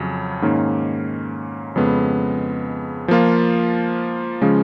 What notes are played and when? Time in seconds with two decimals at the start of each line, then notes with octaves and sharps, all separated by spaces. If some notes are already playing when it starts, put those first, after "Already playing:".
Already playing: F2 C#3 F#3 C#4
0.42 G#2 D#3 A#3 C#4
1.76 F2 C#3 G#3 B3
3.08 F3 A#3 F4
4.42 C#3 F3 G#3 C#4